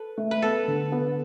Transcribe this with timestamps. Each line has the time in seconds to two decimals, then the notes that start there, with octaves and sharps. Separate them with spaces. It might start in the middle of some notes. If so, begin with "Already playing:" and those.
Already playing: A4 B4
0.18 A3
0.31 B4
0.42 B3 A4
0.68 D3
0.92 B3